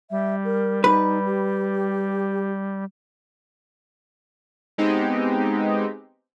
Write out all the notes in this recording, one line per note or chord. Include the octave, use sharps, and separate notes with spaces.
G3 E5
A#4
D#4 B4
G4
G#3 B3 C4 D#4 G4